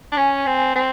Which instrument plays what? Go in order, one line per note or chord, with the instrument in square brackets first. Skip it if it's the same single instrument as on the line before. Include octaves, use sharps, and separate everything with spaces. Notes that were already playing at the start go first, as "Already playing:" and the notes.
[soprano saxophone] D4
[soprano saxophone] C#4 [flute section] G#5
[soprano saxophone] C4
C4